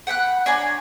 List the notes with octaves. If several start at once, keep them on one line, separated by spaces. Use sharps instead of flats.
F#5 G5 B5 F#6
D4 C#5 G#5 A#5